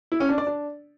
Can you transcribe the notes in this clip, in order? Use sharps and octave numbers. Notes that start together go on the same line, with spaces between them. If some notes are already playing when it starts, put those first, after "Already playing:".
E4
C#4
D4
D5
D4